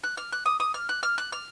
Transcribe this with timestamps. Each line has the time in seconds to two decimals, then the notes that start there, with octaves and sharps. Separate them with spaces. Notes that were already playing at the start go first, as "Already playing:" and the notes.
0.04 F#6
0.17 F6
0.33 F#6
0.46 D#6
0.60 D#6
0.74 F6
0.89 F#6
1.03 F6
1.18 F#6
1.32 F6